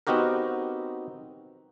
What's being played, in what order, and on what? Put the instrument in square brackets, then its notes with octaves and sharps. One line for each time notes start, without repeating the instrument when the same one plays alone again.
[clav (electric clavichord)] B3 C4 D#4 F#4 G4 A#4